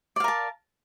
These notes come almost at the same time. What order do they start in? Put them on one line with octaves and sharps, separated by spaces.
D5 F5 A#4 A5